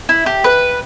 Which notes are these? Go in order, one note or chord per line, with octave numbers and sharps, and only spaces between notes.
E4
G4
B4